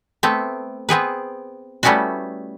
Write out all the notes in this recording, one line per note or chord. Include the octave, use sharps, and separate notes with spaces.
A3 B3 C4
B3 C4 G#4 B4
G3 A3 B3 C#4 E4 F#4